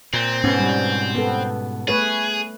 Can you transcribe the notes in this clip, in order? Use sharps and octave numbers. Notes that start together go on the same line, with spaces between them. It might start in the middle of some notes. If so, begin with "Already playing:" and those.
A#2 C4
G#2 B2 B3 C#4
G3
B3 A4
A3 G#4 B4 C#5